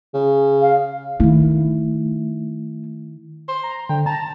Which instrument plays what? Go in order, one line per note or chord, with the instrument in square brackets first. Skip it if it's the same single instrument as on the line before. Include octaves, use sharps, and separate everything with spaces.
[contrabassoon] C#3
[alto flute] F5
[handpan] D#3 E4 [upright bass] A3
[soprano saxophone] C5
[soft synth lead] A#5
[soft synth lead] D3 [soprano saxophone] G5
[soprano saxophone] A5 [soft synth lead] A#5